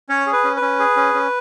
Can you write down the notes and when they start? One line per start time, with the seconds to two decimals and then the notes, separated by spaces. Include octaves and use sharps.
0.09 C#4 C#5
0.26 G#4
0.32 B4
0.44 C#4
0.56 B4
0.62 C#4
0.80 G#4
0.97 C#4
1.14 C#4